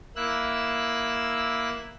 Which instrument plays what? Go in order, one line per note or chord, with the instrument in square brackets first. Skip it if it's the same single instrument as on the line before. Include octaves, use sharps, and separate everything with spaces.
[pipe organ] A#3 E4 E6 F#6